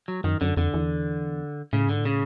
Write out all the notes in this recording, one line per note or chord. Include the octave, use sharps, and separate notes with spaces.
F#3
F#2 D#3
F#2 D3
F2 D3
E2
A2 C#3
G#2 D3
A2
C#3